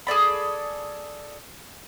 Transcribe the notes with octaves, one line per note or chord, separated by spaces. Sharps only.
G#4 A4 D5 B5